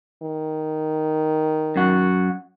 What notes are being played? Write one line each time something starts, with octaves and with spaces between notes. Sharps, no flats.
D#3
F#2 F#4